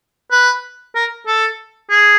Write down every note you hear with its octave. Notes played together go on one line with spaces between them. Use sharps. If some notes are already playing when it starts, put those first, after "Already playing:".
B4
A#4
A4
G#4